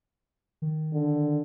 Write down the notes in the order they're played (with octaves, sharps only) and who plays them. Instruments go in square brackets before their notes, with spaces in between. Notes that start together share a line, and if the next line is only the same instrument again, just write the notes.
[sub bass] D#3
[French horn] D3